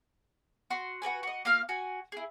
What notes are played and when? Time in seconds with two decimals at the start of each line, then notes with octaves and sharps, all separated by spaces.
0.70 F#4 C6
1.02 F#4 A#4 B4 G#5
1.23 F#4 D#5
1.45 A#3 F4 F5 F6
1.69 F#4 G#5
2.12 E4 G#4